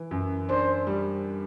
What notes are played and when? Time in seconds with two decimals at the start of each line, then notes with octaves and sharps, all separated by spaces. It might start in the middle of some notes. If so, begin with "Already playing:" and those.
Already playing: E3
0.11 F#2
0.49 D4 C5
0.87 G3